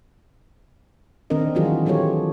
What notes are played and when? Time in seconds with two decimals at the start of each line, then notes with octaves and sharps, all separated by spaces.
1.30 D#3 C4 D4 A#4 D#5
1.55 E3 F#3 G3 F4 F#4 G#4
1.86 F#3 F4 G4 A4 C#5